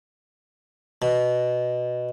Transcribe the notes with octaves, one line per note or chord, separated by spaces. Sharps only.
B2